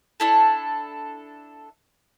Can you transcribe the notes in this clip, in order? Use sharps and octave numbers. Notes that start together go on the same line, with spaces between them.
D4 E4 A4